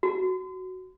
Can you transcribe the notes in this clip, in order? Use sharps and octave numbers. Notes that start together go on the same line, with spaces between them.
F#4